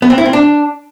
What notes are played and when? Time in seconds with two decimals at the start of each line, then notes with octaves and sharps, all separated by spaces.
0.02 B3
0.10 C4
0.18 E4
0.25 C4
0.33 D4